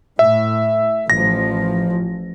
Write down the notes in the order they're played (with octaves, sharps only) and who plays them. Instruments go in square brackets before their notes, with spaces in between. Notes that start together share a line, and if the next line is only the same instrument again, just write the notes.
[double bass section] A2 [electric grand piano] E5
[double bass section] A1 F3 [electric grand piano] A#6